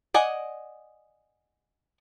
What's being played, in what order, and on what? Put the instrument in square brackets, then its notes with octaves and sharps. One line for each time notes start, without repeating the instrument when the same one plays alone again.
[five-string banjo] D5 D#5 F#5 G#5